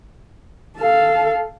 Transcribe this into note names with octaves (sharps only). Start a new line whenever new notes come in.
A4 F5